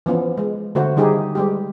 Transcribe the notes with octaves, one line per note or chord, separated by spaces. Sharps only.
E3 F3 B3 C#4
G#3
D3 A3 F#4 C5
D#3 G3 D#4 G4 G#4
G3 G#3 G4